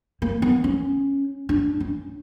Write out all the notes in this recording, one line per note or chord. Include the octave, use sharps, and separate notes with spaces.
A#3
B3
C#4
D4
C#4